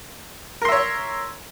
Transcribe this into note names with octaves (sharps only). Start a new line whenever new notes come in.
A#4 C#5 E5 C6